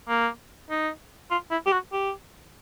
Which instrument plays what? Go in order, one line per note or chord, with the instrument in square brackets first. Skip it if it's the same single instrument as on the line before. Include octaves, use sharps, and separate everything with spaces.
[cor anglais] A#3
D#4
F4
E4
G4
F#4
G4